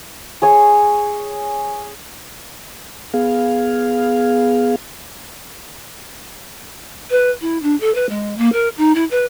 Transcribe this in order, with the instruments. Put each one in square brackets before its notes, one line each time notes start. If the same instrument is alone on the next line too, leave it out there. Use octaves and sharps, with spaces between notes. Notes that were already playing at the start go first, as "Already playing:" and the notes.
[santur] G#4 C#5 G#5
[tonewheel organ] B3 G#4 F5
[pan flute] B4
E4
D4
A4
B4
G#3
A#3
A#4
D#4
E4
B4